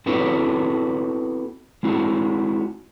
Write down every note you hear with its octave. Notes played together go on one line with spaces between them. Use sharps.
B3 C4 E4 F#4 A4 B4
G#3 C4 E4 F#4